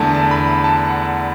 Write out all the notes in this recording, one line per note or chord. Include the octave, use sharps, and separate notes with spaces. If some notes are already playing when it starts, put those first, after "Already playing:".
Already playing: E2 D3 A3 A5
A5
B5
A5
F#5